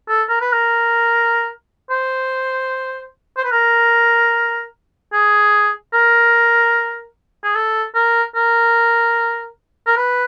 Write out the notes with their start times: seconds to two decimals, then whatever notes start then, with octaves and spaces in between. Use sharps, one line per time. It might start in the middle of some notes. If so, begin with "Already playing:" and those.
0.09 A4
0.29 A#4
0.41 B4
0.53 A#4
1.90 C5
3.38 C5
3.45 B4
3.52 A#4
5.13 G#4
5.94 A#4
7.44 G#4
7.55 A4
7.95 A#4
8.36 A#4
9.87 A#4
9.97 B4